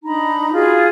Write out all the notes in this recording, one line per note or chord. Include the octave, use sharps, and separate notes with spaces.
D4 D#4 A#5 B5
F4 F#4 G#4